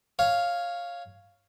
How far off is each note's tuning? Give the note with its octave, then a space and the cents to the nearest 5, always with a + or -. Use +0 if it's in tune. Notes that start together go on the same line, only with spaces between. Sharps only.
C#5 +0 F5 +0